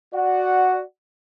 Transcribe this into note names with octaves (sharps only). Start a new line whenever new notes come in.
F#4 D5 F#5